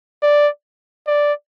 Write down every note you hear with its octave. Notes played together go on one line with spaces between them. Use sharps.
D5
D5